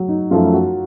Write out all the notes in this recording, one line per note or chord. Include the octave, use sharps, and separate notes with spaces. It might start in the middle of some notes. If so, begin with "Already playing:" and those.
Already playing: F#3
D#4
F#2 F3 A3 F4
F#4